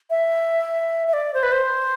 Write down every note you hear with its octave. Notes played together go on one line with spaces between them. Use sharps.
E5
E5
D5
C5
B4
C5